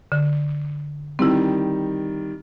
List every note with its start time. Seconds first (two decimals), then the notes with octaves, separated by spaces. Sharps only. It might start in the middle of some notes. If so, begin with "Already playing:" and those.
0.12 D3
1.19 D#3 G3 C4 E4